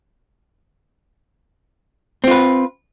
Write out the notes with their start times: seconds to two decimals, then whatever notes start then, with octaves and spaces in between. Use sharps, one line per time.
2.24 C4
2.27 F4
2.31 B4